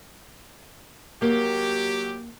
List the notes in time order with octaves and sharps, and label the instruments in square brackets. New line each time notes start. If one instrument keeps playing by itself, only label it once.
[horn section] F#3 G4 [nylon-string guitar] A#3